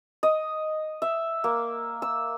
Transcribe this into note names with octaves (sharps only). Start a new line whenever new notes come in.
D#5
E5
A#3
E6